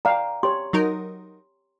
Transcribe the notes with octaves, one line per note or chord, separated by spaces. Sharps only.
D5 F5 G5 A#5
G4 C#5 C6
F#3 D#4 A#4